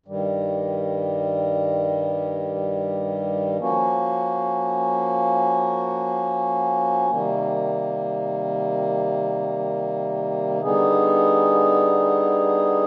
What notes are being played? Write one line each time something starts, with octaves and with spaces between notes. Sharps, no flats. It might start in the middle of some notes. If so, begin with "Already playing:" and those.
G2 D#3 G3
F3 A#3 C#4 F#4
C3 D#3 G3 A#3
D3 G3 B3 D#4 G#4